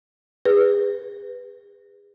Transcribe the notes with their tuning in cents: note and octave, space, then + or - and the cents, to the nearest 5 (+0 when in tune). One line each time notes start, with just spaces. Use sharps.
G#4 -35 B4 +0